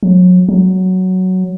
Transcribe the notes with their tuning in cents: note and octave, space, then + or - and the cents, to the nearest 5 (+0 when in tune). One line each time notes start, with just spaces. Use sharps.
F#3 -35
F#3 +5